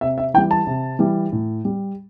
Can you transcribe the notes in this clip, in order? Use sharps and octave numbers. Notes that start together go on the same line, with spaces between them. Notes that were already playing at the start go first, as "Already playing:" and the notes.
C3 E5
E5
E3 G3 G5
A5
C3
E3 G3
A2
G3